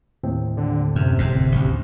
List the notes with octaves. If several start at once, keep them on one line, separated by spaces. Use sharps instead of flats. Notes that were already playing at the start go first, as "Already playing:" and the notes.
D#2 A2 C4
D3
F#2 C3
G1 F2 G#2
A1 D2